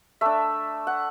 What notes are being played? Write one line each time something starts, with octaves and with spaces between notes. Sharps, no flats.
A3 D4 E5
F#5